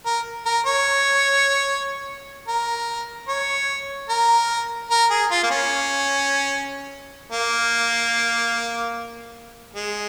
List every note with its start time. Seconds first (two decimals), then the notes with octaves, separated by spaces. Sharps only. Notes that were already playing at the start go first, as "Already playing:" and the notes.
0.06 A#4
0.46 A#4
0.66 C#5
2.48 A#4
3.28 C#5
4.09 A#4
4.91 A#4
5.11 G#4
5.31 F4
5.43 A#3
5.51 C#4
7.33 A#3
9.75 G#3